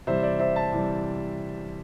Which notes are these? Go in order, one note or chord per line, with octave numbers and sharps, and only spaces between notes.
C3 E3 G3 C5 E5
D5
C5 E5
E5 A5
C3 E3 G3